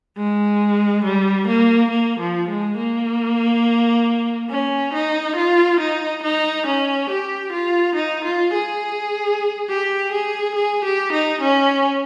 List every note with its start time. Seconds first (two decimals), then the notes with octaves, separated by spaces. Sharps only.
0.17 G#3
1.04 G3
1.47 A#3
1.90 A#3
2.19 F3
2.49 G#3
2.77 A#3
4.50 C#4
4.93 D#4
5.36 F4
5.80 D#4
6.23 D#4
6.66 C#4
7.10 G4
7.53 F4
7.95 D#4
8.25 F4
8.54 G#4
9.69 G4
10.12 G#4
10.55 G#4
10.85 G4
11.12 D#4
11.41 C#4